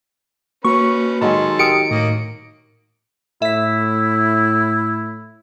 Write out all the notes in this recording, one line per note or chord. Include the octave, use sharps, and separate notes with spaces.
A#3 C#4 F#4 B4 C#6
D#3 F#3 G#3 A4 A5 C6
G4 A#4 G5 D#6 C#7 D7
A2 A#3 D#5
A2 E4 E5 B6